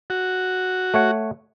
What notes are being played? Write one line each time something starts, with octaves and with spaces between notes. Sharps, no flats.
F#4
A3 C#5 F#5